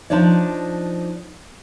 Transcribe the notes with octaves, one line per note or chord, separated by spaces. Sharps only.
F3 D4 D#4 C#5 D5